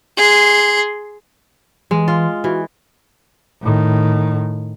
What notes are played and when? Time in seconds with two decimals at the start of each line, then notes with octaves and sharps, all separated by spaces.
0.17 G#4 C6
1.91 E3 G#3
2.08 F4
2.44 E3 F#4
3.62 A2 D#3